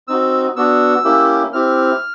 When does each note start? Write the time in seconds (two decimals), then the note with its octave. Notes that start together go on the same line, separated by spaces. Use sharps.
0.08 C4 D#4 F#4 E6
0.56 B3 D4 F#4 E6
1.04 A#3 C#4 E4 G4
1.53 C4 E4 G4 F6